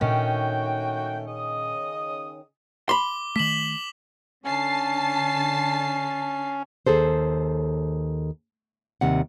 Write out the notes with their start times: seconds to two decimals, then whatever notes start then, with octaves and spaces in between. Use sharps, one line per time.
0.01 A#2 D#3 A3 C#4 D4 F#4 G5
1.28 C#3 D#5 D#6
2.89 B5 C6 D6 G7
3.36 D#3 A3 B6 E7 F#7
4.45 D3 C#4 A5 C7
6.87 D#2 G#4 A4 C5
9.01 D#2 C3 G3 F#5